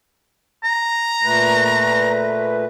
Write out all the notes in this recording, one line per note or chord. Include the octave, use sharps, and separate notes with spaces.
A#5
A#2 A3 B4